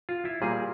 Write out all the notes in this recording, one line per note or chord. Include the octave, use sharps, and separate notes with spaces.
F4
E4
A#2 G3 A#3 G#4